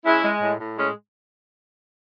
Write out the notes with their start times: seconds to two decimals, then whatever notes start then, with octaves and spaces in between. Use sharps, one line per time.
0.05 G#3 C#4 E4
0.23 G#3
0.41 A2
0.60 A2
0.77 G#3 C#4